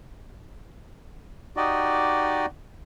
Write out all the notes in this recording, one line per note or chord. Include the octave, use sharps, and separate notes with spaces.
D#4 F#4 G4 D5 D#5